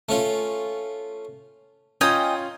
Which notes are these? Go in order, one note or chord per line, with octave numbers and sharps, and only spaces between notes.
A3 C#4 F4
C#4 F4 D#5 G5 G#5 A#5